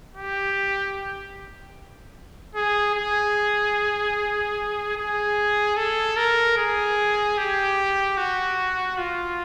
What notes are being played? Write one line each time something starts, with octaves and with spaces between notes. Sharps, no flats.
G4
G#4
G#4
G#4
A4
A#4
G#4
G4
F#4
F4